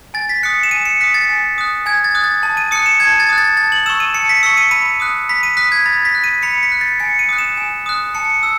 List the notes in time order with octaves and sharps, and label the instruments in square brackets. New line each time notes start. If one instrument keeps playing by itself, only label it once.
[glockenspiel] G#5 A6
B6
D#6 F#6 C#7
E7
G#5 D#7
C#7
D#6 F#6 B6
A6
G#5
D#6 F#6
G#5 G#6
A6
D#6 F#6
A6
A5
D#7
D#6 F#6 C#7
E7
A5 G#6
A6
D#6 F#6
A6
A5 A6
F#7
C#6 E6 E7
D#7
A5 C#7
B6
C#6 E6 C#7
D#7
B5 D#7
D#6 F#6
B5 B6
D#7
D#6 F#6 B6
G#6
B5 A6
B6
F#6
D#7
B5 C#7
B6
F#6
A6
G#5 C#7
D#7
D#6 F#6
E7
G#5
D#6 F#6
A5 C#7
E6